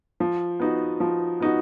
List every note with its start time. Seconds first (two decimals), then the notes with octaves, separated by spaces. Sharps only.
0.20 F3
0.60 B3 D#4 F#4
1.00 F3
1.40 B3 D#4 F#4